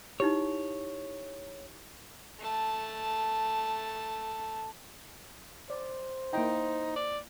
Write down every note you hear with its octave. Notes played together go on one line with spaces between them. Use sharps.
D#4 E4 G4 C#5
A3 A5
C5 D5
A#3 D#4 E4 G5
D5